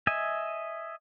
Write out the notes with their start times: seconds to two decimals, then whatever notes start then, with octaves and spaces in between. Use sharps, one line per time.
0.07 D#5 E5 G#5